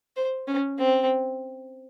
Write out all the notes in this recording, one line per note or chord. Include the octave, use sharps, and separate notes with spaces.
C5
C#4
C4